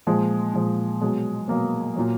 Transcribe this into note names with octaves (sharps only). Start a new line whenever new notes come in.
A#2 F3 G#3
A#2 F3 G#3
B2 F#3 G#3
B2 F#3 A#3
A#2 F#3